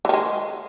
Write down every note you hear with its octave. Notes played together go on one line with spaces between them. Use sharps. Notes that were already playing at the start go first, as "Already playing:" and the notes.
D#3 E3 G#3